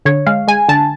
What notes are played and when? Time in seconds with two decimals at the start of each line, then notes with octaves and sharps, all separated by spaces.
0.05 D3 C#5
0.26 G#3 F5
0.48 G#3 G#5
0.68 D3 A5